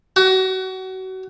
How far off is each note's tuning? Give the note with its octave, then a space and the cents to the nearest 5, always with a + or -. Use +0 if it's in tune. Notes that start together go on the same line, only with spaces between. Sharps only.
F#4 +30